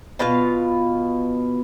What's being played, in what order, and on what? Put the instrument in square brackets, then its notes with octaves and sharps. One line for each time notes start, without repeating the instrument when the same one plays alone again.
[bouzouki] B2 B3 F4 F5